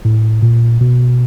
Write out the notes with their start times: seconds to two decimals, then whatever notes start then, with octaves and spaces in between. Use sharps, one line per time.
0.05 A2
0.42 A#2
0.81 B2